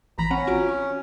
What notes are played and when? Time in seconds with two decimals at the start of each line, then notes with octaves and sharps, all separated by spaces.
0.18 A1 E3 A#5 B5
0.31 C4 C#4 F#5
0.47 F4 F#4 D7
0.69 C#6